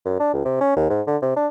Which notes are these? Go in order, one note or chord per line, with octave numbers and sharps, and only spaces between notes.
F#2
D4
C#2
C3
C#4
D#2
G#2
D3
C3
D4